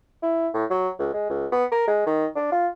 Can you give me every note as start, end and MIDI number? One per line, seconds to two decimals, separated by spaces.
0.22 0.48 64
0.54 0.65 45
0.70 0.89 54
0.98 1.09 37
1.13 1.26 56
1.30 1.46 37
1.52 1.65 59
1.71 1.83 70
1.87 2.05 56
2.06 2.26 51
2.36 2.48 62
2.52 2.68 65